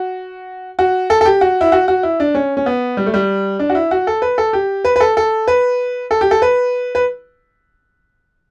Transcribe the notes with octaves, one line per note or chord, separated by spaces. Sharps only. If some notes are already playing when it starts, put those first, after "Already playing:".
Already playing: F#4
F#4
A4
A4
G4
F#4
E4
F#4
F#4
E4
D4
C#4
C#4
B3
G3
A3
G3
D4
F#4
E4
F#4
A4
B4
A4
G4
B4
B4
A4
A4
B4
A4
G4
A4
B4
B4